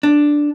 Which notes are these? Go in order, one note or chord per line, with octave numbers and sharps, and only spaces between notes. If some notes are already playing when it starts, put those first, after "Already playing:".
D4